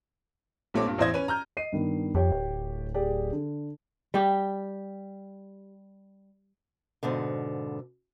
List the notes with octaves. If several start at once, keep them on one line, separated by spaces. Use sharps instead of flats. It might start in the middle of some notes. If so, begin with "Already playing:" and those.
A#1 G3 A3 C4 C#5 D6
G2 A#2
A1 E2 E4 C5 D#5 G#6
C#4 B4 D#7
A#5 F6 G6
D#5 C7 D#7
G2 D#3 B3
F2 G4 C#5 G5
D1
G4 G#4 D5
D3
G3 G4
F2 G#2 B2 D3